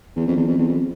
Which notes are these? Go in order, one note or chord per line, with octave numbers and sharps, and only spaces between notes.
E2
F2
E2
F2
E2
F2